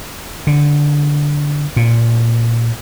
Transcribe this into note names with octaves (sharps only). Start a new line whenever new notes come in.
D3
A#2